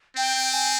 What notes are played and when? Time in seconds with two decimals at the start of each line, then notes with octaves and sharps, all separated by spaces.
0.17 C4 G5
0.53 G#5